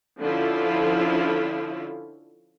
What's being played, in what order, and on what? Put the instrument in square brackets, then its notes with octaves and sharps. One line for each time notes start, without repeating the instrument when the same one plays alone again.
[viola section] D3 F3 C#4 E4 F4